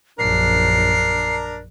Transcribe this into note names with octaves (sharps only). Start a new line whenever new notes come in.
A#1 F#2 D4 A#4 C7